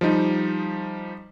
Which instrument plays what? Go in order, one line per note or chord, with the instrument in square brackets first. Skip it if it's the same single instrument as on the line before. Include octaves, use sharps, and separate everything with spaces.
[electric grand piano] F3 G3 D#4